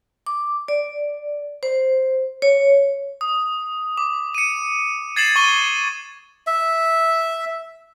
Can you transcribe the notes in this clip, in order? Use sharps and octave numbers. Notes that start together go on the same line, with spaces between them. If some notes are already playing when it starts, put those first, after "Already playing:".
D6
D5
C5
C#5
D#6
D6
C#7 D#7
G#6 A6 C7 C#7 E7 F#7
C#6 D#7 G7
E5